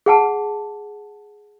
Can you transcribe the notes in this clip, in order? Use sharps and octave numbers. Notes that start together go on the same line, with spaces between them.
G#4 F#5 A5